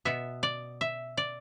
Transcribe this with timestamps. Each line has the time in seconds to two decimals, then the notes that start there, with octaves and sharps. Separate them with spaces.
0.05 B2 B3 E5
0.43 D5
0.81 E5
1.17 D5